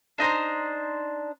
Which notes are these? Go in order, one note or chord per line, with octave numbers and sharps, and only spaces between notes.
D4 D#4 C5 A#5